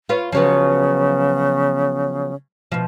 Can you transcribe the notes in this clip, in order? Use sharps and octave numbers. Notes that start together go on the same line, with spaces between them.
F4 B4 C#5
C#3 F3 F#3 B3
B2 F3